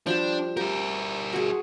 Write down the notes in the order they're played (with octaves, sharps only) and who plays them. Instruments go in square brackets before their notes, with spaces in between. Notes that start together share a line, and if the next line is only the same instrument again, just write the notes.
[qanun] F3 G3 G4 [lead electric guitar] D4
[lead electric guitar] G3 A#4 [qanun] G4
[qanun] F#4 G#4